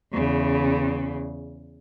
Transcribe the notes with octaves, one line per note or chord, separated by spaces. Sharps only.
E2 C#3